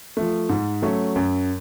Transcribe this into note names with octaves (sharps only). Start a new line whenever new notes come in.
F3 A3
G#2
F#3 A3 C#4
F#2